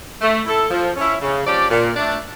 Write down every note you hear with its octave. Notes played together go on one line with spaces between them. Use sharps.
A3
E4 A4
F3
C#4 E4
C#3
F3 C#4 G4 D5
A#2
A3 D4